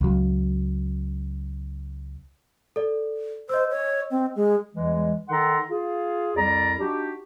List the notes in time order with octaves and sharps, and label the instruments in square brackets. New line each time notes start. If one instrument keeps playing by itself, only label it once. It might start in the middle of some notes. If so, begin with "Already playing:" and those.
[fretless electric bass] C#2 F#3
[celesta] A4 D5
[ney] C5 [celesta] D#5 E6
[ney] C#5
C4
G#3
[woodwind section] E2 E3 G3 G#3
D#3 D#4 A4 F#5 A#5 C6
F4 G#4
C2 F2 G3 D5 A#5
D4 D#4 F#4 G4